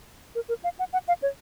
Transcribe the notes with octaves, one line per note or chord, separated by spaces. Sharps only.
A#4
A#4
F5
F#5
F#5
F5
C#5